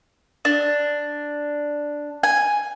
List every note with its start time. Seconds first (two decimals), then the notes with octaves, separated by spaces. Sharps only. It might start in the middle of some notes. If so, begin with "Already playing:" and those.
0.45 D4
2.23 G#5